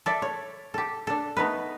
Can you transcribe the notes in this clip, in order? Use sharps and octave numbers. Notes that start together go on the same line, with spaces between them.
A4 D5 E5
C#5
G4 A4
D4 A4
A3 B3 D#4 B4